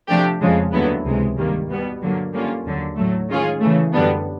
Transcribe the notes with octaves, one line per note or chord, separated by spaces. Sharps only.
C3 F3 A3 D4 G4
F2 C#3 F3 G#3
D#2 D3 F#3 B3 E4
C#2 C3 E3 G#3
G2 D#3 G3 A#3
B2 G3 B3
G2 D3 F#3 A#3
D3 G3 A#3 C#4 F4
D#2 D3 F#3
A2 F#3 A3
D#3 G#3 C#4 F4 G#4
C#3 E3 A3
F#2 D3 G3 B3 D4